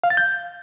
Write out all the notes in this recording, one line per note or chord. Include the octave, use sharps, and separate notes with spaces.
F5
A6
G6